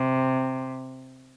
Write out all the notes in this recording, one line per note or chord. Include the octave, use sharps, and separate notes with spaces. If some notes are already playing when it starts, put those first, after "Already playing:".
Already playing: C3